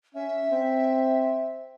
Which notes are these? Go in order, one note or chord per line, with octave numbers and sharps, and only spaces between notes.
C#4 E5
C4